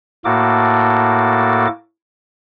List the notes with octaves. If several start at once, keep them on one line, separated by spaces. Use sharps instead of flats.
A2 A#3 F#4 A4 D6